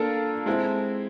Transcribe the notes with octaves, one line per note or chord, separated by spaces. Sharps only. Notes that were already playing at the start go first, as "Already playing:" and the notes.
Already playing: A#3 D4 F4 A4 A#4
G#3 C4 E4